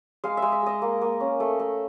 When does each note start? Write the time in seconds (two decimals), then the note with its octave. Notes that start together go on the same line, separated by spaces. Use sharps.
0.24 G#3 F5
0.37 E5
0.42 G#3
0.52 E5
0.62 G#3 D#5
0.82 A#3
1.02 A#3
1.20 C#4
1.40 A3
1.60 A3